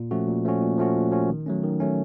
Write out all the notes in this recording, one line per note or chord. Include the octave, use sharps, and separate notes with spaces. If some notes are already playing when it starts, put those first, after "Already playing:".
Already playing: A#2
F3 A3 C#4 F#4
A#2
F3 A3 C#4 F#4
A#2
F3 A3 C#4 F#4
A#2
F3 A3 C#4 F#4
D#3
F#3 A3 C#4
D#3
F#3 A3 C#4